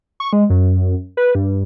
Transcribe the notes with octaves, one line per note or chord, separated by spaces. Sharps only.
C#6
G#3
F#2
B4
G2